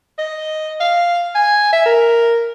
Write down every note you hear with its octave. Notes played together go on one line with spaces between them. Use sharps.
D#5
F5
G#5
E5
A#4